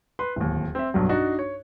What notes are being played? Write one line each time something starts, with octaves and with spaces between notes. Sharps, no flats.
B4 C6
D1 D#2
C4 E5
B1 G2 F#3
D4 D#4 F#4
C#5